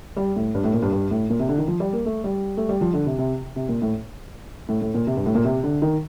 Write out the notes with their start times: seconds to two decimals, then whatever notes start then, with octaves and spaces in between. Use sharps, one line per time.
0.17 G3
0.36 A2
0.55 G2
0.64 A2
0.73 A#2
0.82 G2
0.93 G2
1.11 A2
1.30 A#2
1.39 C3
1.49 D3
1.58 D#3
1.68 F3
1.80 G3
1.93 A#3
2.06 A3
2.24 G3
2.57 A3
2.69 G3
2.81 F3
2.93 D3
3.06 C3
3.19 C3
3.56 C3
3.69 A#2
3.82 A2
4.69 A2
4.81 A2
4.94 A#2
5.07 C3
5.17 G2
5.26 A2
5.35 A#2
5.45 C3
5.63 D3
5.82 D#3